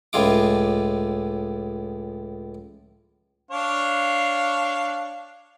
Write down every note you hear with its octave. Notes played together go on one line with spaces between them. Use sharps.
C#2 A2 G#3 F4 D6
D4 C#5 F5